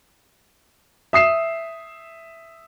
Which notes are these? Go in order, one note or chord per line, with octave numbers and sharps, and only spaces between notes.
E5 D#6 C7 E7